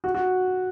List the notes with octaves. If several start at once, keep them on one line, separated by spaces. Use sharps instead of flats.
F#4
F#4